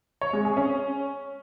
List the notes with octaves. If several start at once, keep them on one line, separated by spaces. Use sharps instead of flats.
C#5
G#3
G#4
C#4